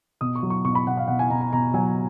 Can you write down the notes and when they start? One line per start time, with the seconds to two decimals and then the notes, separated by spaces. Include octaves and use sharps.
0.21 B2 D#6
0.35 C#6
0.43 F#3
0.50 C#6
0.65 B2 C#6
0.75 B5
0.87 B2 F#5
0.97 F5
1.08 B2 F#5
1.19 G#5
1.30 B2 A#5
1.41 A#5
1.53 B2 A#5
1.74 F#3 G#5